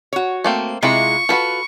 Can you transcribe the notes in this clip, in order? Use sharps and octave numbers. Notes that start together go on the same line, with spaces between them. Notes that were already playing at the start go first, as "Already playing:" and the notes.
F#4 C#5
A3 A#3 C4
C3 G#3 E4 F4 B5 C#6
F4 F#4 G#4 A4 B4